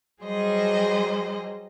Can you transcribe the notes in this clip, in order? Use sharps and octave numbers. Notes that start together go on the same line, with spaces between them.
F#3 G3 G#4 C5 D#5